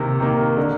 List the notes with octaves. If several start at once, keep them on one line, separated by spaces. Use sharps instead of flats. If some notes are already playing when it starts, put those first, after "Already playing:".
Already playing: C3 D#3 A#3
D#3 A#3
D3